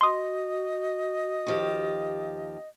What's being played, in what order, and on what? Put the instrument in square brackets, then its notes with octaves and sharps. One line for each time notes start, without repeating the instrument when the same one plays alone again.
[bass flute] F#4 [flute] D#5 [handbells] C6 D#6
[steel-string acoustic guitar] D#2 F3 G4